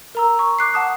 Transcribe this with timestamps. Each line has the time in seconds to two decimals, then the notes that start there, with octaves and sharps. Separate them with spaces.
0.15 A#4 A#5 E6
0.39 C#6
0.59 D6 F#6 C7
0.74 F#5 A5 D#6